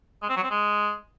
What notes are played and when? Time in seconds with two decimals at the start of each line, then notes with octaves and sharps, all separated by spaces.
0.22 G#3
0.29 C4
0.36 F#3
0.44 C4
0.51 G#3